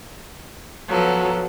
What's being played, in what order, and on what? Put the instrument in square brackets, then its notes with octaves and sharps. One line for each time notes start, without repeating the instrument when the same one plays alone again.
[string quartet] F3 F#3 B3 A4